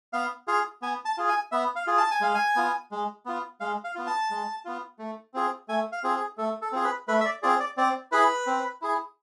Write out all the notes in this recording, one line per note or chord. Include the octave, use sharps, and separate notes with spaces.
B3 F5
F4 G#4 F5
B3 G#5
A5
F4 G#4
G#5
B3 E5
F5
F4 G#4
A5
G#5
G#3 F5
G#5
B3 F4
G#3
B3 F4
G#3 F5
F5
B3 F4
A5
G#3
B3 F4
A3
C4 F4 G#4
A3 G#5
F5
C4 F4 G#4
G#4
A3 A4
A4
C4 F4 G#4
B4
A3 B4
E5
D5
C4 F4 G#4 D5
D5
C4 D5
E4 G#4 B4
C4
E4 G#4